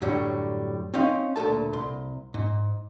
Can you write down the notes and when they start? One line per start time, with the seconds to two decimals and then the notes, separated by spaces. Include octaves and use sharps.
0.02 F#2 A2 D3 F#3 G3
0.94 C4 C#4 D#4 F5
1.36 D2 A#2 A4 A5
1.73 C2 C6
2.34 G#2